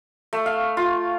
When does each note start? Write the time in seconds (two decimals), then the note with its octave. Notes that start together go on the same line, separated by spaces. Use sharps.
0.33 A3
0.46 F5
0.77 F4